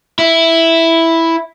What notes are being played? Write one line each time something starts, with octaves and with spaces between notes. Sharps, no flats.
E4